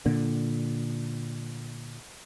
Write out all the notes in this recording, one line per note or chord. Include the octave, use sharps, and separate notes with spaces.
A#2 D3